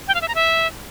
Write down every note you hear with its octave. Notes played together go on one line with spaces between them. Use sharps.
G5
F5
E5
A#5
E5